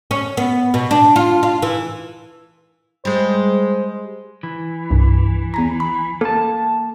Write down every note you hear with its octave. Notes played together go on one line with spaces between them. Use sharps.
C#4
B3
B2
D4
F4
F4
E3
G3 G#3 C5
E3
C2 G2
E2 G#5 A#5
B5
A#3 A4 A5